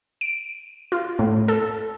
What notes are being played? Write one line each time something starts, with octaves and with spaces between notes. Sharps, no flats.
D7
F4
A2
A4